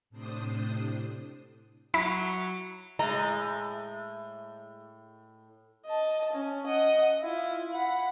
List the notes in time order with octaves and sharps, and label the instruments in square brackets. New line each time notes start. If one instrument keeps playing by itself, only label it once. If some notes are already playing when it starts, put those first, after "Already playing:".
[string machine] A2 C3 D4 C5 D#6
[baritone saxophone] F#3 [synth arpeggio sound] E4
[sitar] A2 [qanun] G#3 [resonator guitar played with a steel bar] D#5 [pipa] A#5
[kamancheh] D#5 A5
C#4
D#5 F#5
E4 F4
F#5 B5